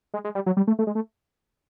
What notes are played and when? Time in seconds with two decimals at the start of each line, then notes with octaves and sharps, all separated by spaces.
0.14 G#3
0.24 G#3
0.35 G3
0.46 F#3
0.57 G3
0.67 A3
0.79 A3
0.87 G#3
0.95 A3